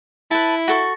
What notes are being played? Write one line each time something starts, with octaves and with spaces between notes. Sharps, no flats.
E4 B4 A5
F#4 A4 C#6